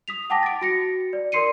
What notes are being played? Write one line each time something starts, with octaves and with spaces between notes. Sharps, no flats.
D#6 B6 F7
F#5 G5 A5 D6 A#6
A6 D7
F#4 A#6 C#7
D5
A#4 D5 C6 C7 C#7 D#7